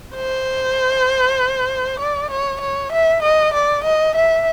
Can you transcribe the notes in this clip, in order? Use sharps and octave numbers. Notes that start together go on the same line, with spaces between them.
C5
D5
C#5
C#5
E5
D#5
D5
D#5
E5